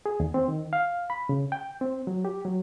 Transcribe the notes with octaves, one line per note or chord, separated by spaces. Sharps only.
G#4
D#2
C4
D#3
F5
B5
C#3
G5
C4
F#3
G4
F#3